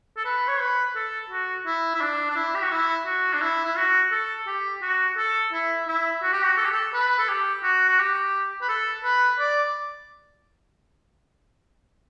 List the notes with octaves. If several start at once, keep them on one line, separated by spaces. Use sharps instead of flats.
A4
B4
C#5
B4
A4
F#4
E4
E4
D4
D4
E4
G4
F#4
E4
F#4
D4
E4
E4
F#4
A4
G4
F#4
A4
E4
E4
F#4
G4
F#4
A4
G4
A4
B4
A4
G4
F#4
F#4
G4
B4
A4
B4
D5